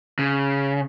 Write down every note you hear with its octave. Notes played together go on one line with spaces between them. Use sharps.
C#3